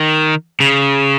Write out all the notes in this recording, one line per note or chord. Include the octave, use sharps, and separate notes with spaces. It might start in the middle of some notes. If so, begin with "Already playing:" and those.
Already playing: D#3
C#3